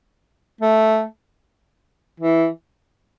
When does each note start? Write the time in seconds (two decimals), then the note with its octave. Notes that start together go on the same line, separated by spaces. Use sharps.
0.61 A3
2.20 E3